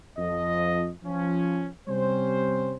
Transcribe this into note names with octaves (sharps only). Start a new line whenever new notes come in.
F2 F3 D#5
F3 C#4
C3 G3 C4 C#4 C5